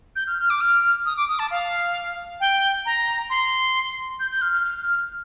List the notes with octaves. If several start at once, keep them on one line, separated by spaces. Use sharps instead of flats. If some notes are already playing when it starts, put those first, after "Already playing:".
G6
F6
F6
D6
F6
D#6
D6
D#6
A5
F5
G5
A#5
C6
G6
G6
F6
F6
F6